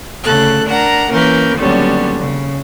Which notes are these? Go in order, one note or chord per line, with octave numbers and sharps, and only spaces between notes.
D2 C#3 A4 F#6
D4 A#4 F#5 A#5
E3 A#3 C#4 A#4 B4 G6
D#2 D3 F#3 G3 B3 C#4
C#3